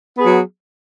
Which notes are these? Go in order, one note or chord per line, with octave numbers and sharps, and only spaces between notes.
F#3 B3 G#4